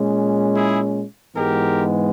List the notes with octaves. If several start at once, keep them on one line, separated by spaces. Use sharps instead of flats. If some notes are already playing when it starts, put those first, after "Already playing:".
Already playing: A#2 G#3 C#4
E4 G#4
G#2 E3 G#3 B3 G4 A#4